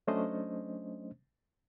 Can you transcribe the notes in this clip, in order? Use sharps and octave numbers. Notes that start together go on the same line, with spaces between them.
F#3 A3 C#4 D4 C5 D#5